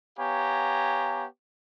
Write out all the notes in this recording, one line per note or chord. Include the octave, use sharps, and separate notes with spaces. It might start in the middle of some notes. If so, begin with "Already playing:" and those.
B3 G4 C#5 F5 G#5 A#5